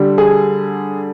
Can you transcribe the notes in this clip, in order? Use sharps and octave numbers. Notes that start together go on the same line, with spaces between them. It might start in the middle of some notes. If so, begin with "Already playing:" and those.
Already playing: D3 G3
G#4